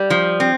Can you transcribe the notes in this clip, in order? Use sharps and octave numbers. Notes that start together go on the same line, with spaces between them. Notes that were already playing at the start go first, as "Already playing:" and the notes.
Already playing: G3
F3
C4